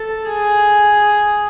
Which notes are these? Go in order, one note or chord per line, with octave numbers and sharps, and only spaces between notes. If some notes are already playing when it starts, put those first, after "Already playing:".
Already playing: A4
G#4